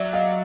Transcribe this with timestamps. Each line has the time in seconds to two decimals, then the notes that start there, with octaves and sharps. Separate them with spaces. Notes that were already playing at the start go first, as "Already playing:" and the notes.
Already playing: F#3 D5 E5
0.13 D#5 F5